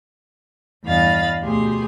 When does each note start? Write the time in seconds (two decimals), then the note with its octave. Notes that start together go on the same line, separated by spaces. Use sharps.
0.86 E2 G2 D#5 F5 B5 A6
1.42 D2 B2 G4 G#4 C6